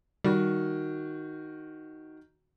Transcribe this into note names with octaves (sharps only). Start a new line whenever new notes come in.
D#3 G3 F#4